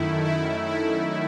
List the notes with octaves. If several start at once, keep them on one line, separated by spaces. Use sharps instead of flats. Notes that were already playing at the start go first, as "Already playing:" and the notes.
Already playing: F#2 D#3 A3 E4
E4
E4